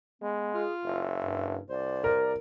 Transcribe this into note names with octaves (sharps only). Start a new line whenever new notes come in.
G#3 B3
F4 G#4
F#1 E5
G2
C2 C5 D5
A#4